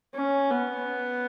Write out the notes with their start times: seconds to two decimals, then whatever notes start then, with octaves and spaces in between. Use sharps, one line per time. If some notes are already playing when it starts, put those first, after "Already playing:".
0.15 C#4
0.51 B3